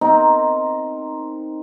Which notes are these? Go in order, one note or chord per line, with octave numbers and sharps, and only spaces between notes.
C4 D#4 A#4